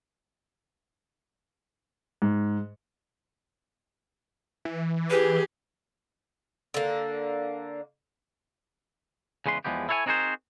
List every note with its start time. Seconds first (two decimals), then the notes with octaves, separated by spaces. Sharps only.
2.22 G#2
4.65 E3
5.10 G4 G#4 B4
6.74 D3 A#3
9.46 E2 C#3 G#3 B4 C6
9.65 E2 A2 F3 G#3 B3 G4
9.89 E4 A4 C#5 F5 G#5
10.06 C4 D#4 F#4 G#4 A#4 C5